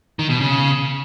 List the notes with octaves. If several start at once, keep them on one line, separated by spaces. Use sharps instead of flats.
D#3
B2
C#3